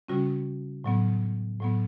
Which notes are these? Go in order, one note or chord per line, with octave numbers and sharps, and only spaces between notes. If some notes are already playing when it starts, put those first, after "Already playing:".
C#3 G3 C#4 F#4
A2 F#3 B3
A2 F#3 B3